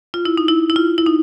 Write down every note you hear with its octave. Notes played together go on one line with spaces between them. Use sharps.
F4
E4
D#4
E4
E4
F4
E4
D#4